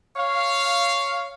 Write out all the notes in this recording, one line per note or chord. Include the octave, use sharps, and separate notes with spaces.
C#5 F5